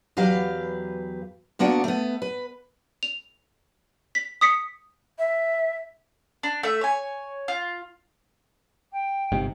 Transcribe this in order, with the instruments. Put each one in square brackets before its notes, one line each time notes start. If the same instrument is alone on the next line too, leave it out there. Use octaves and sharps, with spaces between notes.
[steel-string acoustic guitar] E2 F#3 G4 B4 F5
D3 A#3 B3 D4 F#4 F#5
A3 B3
B4
[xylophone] F7
B6
D#6 B6 C#7
[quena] E5
[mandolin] D4
A3 E5
C#5 G#5
F4
[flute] G5
[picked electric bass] G1 G#2 C3